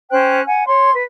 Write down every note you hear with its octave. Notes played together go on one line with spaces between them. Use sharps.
C#4 C5 G5 F#6
F#5 G#5
C#5 C6
B4